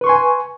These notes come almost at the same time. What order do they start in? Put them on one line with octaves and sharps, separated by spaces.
B4 C#6 C6 G#5